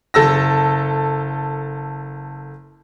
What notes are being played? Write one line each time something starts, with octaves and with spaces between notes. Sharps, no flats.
F#1 A4 E6 A#6